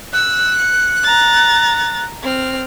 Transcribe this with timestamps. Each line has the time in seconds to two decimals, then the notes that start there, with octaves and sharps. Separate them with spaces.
0.13 E6 F#6
0.58 C#7
1.03 A#5 A6
2.23 C4 F6